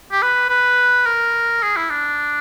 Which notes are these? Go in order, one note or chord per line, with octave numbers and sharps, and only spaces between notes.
G4
B4
B4
A#4
G#4
E4
D4